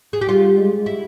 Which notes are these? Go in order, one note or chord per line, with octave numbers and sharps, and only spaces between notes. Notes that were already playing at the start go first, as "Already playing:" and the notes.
G#4
G4
G3 F4
G#3
E4